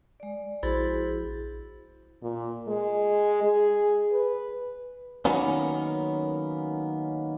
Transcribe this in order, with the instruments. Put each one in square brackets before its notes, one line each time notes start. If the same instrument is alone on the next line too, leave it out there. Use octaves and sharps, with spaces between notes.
[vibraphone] G#3 D5
[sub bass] A#1 [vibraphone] E4 F#4 G#4 [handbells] C5 B5 A6
[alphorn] A#2
G#3
G#4
B4
[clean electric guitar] D#3 F#3 A#3 B3 C#4